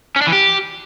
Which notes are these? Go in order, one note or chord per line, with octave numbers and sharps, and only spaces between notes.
C#4
D4
E3
G4